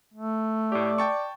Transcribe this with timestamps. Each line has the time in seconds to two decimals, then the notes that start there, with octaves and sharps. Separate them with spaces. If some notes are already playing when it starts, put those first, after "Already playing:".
0.14 A3
0.72 A2 G4 D5
0.98 G5 A5 C#6